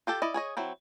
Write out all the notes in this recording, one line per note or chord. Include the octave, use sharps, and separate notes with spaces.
F4 G4 A4
E4 D5 D#5
G#4 C#5 D#5
F#3 C4 E4